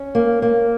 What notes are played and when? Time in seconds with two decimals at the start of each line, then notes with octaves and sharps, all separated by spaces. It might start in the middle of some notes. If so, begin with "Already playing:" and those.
Already playing: C#4
0.15 A#3
0.42 A#3